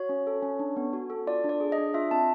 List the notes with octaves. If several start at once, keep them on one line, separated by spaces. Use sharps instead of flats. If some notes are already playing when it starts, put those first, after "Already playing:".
Already playing: F#4 C#5
C#4
A4
C#4
D4
B3
F#4
A4
F4 D5
D4
D5
G#4
D#5
D4
F4 E5
C4 A5